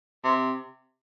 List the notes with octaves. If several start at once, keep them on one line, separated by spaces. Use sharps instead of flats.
C3